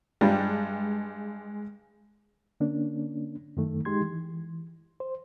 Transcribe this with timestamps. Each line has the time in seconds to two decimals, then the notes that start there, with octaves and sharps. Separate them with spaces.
0.21 G2 G3 G#3
2.60 D3 A#3 C#4 D4
3.57 F#2 D#3 A3
3.85 G#3 D#4 G4 C6 G#6
4.01 E3
5.00 C5